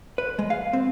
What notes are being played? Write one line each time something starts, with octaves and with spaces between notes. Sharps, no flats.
B4
G#3
F5
C4